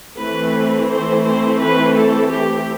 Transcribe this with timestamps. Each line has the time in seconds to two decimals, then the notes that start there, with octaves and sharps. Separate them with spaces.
0.19 E3 A3 C4 B4
0.89 C5
1.25 C5
1.61 B4
1.96 A4
2.32 G4